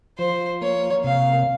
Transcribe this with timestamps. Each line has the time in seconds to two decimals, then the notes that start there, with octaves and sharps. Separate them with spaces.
0.18 F3 C5
0.62 A#3 C#5
1.04 C3 F5